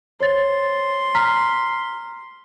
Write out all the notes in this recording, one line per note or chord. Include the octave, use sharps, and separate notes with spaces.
C5 C#5 C6 A6
A#5 F6 B6